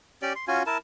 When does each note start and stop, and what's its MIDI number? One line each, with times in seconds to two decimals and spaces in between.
0.22 0.33 61
0.22 0.33 67
0.22 0.33 74
0.35 0.45 84
0.48 0.63 61
0.48 0.63 65
0.48 0.63 66
0.48 0.63 80
0.66 0.78 64
0.66 0.78 70
0.66 0.78 81